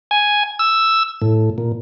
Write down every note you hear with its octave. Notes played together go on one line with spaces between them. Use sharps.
G#5
E6
A2
A#2